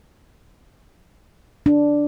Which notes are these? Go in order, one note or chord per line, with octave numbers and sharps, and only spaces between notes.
D4